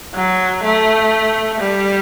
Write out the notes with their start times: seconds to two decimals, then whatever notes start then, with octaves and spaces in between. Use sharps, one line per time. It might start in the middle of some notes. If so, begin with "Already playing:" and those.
0.14 F#3
0.64 A3
1.60 G3